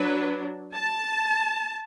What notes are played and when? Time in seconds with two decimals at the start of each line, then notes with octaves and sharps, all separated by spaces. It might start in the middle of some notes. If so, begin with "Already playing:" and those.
Already playing: F#3 D4 B4
0.74 A5